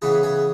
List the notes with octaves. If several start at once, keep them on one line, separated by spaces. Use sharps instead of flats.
C#3 E3 B3 G#4
G#4